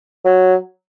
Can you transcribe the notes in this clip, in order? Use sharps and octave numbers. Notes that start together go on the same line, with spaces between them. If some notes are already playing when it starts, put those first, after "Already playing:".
F#3